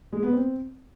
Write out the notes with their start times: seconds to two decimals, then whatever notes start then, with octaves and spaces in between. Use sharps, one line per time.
0.13 G#3
0.23 B3
0.33 C4